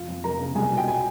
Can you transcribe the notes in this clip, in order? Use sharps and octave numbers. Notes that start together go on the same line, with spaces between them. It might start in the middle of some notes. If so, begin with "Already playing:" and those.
Already playing: F1 F4 F5
F2
F1 A#4 A#5
C#3
C2 G#4 G#5
B2
G5
G#5